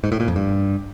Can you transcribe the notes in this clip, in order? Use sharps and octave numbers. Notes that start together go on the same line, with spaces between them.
G#2
A2
A#2
F2
G2